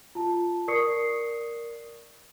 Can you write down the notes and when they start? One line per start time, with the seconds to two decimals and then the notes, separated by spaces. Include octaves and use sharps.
0.15 F4 A5
0.68 A#4 D5 C#6 D#6 C7 C#7